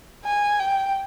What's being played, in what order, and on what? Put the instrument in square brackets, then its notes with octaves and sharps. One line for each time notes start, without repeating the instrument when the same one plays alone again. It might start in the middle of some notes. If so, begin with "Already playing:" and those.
[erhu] G#5
G5